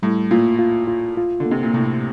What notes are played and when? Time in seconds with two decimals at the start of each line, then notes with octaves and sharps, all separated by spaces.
0.03 A2 G3
0.31 A#2 F4
0.59 F4
0.88 F4
1.17 F4
1.40 D3
1.46 A#3
1.51 C3
1.63 A#2
1.74 A2 C3